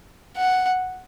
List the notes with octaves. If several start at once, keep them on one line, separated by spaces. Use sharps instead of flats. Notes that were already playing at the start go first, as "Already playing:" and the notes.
F#5